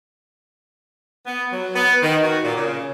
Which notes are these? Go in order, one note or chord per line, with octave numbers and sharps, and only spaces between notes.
B3
F#3
B3
D#3
F#4
A#2
C#3